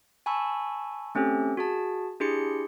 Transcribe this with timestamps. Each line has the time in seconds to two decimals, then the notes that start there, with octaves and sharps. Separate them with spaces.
0.26 G#5 A5 B5 C#6 E6
1.15 A3 C4 C#4 G4 A4
1.57 F#4 G#4 A5
2.20 D4 E4 G4 G#4 C6 C#7